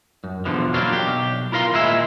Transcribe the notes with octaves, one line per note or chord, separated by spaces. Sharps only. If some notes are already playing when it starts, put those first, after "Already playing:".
F#2
E2 B2 D3 F3
F#3 A#3 D4 F4
B1 G4
E4 F4 A#4 F5 C6
D#2 A#2 G#3 E4 F4 E5